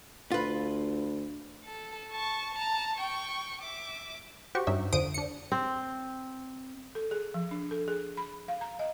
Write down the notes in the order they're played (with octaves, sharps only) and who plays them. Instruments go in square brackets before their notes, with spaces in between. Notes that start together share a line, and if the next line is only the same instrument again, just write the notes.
[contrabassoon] D2 [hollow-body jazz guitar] F4 B4
[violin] A4
A5 C#6
A5 A#5
G5 C#6
E5 D6
[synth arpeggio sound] F#4 G4 C5 C#6
G2 C#4 D#4 E5
F2 D3 C5 D#6 D7
D4 C#7
[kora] C4
[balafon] A4
G#4
F3
D4
A4
G#4
B5
F5
A#5
D#5